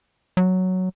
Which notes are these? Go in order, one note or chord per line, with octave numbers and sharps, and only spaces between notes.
F#3